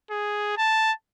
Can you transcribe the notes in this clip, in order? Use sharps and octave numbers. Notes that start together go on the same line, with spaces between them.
G#4
A5